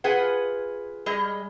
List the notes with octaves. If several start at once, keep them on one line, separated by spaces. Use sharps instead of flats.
F4 G#4 B4 F#5
G3 G#3 D#5